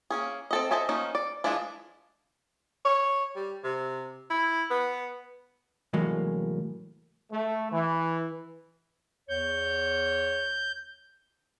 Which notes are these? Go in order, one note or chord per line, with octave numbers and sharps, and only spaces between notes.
A#3 C#4 G#4
C4 A4 D#5
A4 C5 D#5 E5 G#5
D#3 F3 A#3 C#4 D#4
D5
E3 F3 G#3 D4 E4
C#5
G3
C3
E4
B3
C2 A2 E3 F#3 G#3 A#3
A3
E3
E2 C#5 G6